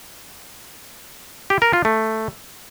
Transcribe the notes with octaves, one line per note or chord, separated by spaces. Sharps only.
G4
A#4
F4
A3